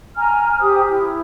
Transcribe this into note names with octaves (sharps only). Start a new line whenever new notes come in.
G#5 A#5 F6
G4 C5 G5 D#6
E4